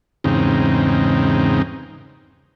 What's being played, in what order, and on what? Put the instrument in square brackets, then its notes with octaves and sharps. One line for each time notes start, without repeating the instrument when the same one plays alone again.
[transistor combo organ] E2 G#2 C#3 C4 D#4